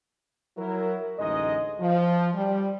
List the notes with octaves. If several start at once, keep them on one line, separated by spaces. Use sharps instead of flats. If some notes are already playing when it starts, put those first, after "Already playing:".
F#3 E4 A#4
A1 D2 G#3 D#4 D#5
F3
G3